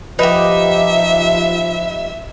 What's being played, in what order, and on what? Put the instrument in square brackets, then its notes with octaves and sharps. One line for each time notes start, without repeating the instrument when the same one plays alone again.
[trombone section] F3 [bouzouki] D#4 G4 [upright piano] B4 [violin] E5